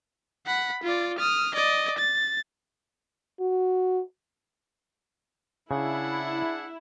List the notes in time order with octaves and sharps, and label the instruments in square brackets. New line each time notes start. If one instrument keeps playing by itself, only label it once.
[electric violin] F#5 B5
F4 D5
D#6 F6
D5 D#5
A6
[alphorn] F#4
[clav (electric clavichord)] C#3 [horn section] D4 G#4 F#5 [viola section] E4